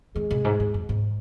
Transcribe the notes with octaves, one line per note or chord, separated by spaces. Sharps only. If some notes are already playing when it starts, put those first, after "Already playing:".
D#3 G#3
C#3
F#2
G#2
G#2
F#2
G#2